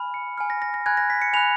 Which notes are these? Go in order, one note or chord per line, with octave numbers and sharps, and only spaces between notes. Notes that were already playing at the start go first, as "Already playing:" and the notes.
Already playing: G#5 B5 F6
C#7
G#5 B5 F6
A#6
A#6
A#6
G#5 B5 F#6 G#6
A#6
B6
C#7
G#5 B5 F#6 F7